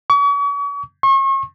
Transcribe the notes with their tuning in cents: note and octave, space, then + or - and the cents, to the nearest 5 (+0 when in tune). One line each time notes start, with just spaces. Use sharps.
C#6 +40
C#6 -40